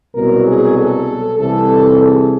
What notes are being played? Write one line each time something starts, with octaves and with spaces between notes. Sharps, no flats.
C2 B2 F#3 A#4
G#4
A4
C2 C3 E3 A4
G#4